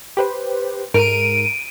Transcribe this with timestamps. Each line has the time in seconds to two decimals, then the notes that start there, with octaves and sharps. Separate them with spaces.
0.17 G4 B4 C5
0.94 G#2 A#4 D7 D#7